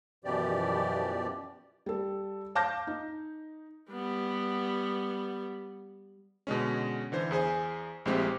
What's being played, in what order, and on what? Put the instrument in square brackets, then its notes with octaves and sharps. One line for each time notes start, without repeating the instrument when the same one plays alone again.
[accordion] F#2 B2 E3 F3 G4 D5
[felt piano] G3 A4
F5 A5 D6 F6 G6 A#6
D#4
[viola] G3 B3
[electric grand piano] B2 D3 G#3 C#4
D3 E3 C5
E2 G#4 C5 G#5
A#1 A2 G#3 C4 G4